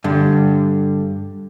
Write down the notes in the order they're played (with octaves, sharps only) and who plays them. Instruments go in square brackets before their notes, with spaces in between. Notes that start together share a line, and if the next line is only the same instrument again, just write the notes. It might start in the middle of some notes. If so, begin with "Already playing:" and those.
[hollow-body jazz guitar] G2 D3